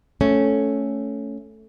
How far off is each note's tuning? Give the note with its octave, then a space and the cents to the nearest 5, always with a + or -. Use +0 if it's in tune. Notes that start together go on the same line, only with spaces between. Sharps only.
A3 -5 C#4 +0